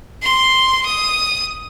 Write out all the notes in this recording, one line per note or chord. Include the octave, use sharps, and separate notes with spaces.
C6
D#6